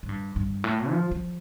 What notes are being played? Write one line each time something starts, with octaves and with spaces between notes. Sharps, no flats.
A2
G2
G2
A2
F3
F3